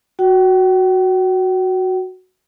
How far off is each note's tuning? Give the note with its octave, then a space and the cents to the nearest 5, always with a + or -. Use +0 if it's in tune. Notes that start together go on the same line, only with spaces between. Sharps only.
F#4 +0 G5 -40